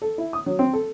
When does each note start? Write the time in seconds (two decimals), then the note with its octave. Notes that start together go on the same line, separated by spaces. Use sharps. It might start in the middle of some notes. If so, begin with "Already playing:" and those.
0.02 A4
0.18 E4
0.33 D#6
0.46 F#3
0.59 C4
0.73 A4